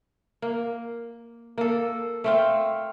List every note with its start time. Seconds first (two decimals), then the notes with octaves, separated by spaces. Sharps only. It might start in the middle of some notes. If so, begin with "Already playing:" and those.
0.42 A#3
1.58 A#3 A4
2.24 A3 C4 F5